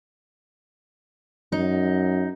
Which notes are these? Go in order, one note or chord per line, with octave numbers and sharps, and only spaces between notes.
F#2 D#4